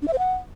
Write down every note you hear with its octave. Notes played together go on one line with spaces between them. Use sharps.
D4
E5
C5
F#5